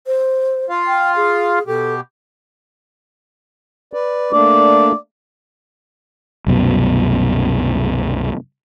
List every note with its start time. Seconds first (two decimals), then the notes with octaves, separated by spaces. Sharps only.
0.07 C5
0.69 F4 F5
0.87 G5
1.16 G#4
1.67 B2 G4 A4
3.93 B4 D5
4.33 A3 A#3 D4 D5
6.47 C2 F#2 B2